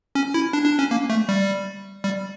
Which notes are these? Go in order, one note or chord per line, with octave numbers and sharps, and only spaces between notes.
C#4
E4
D4
D4
C#4
A#3
A3
G3
G3